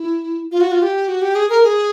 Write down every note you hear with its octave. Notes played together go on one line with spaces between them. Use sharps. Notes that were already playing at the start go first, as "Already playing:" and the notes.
Already playing: E4
F4
F#4
F4
G4
F#4
G4
G#4
A#4
G#4